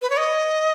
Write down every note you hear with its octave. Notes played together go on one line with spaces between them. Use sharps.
B4
C#5
D#5